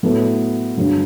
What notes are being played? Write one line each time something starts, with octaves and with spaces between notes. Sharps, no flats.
A2 F#3 B3 E4 A4
G2 D3 F#3